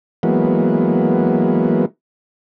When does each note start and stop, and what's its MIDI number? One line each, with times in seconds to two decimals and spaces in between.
0.23 1.85 52
0.23 1.85 54
0.23 1.85 56
0.23 1.85 58
0.23 1.85 59